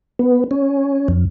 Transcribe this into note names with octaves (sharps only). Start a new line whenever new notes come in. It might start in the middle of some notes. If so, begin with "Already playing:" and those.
B3
C#4
F2